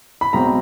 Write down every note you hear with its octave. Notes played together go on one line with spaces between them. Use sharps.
B5
B1 B2 G#3 C4 A#5